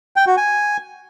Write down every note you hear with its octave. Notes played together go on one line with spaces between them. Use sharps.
G5
F#4
G#5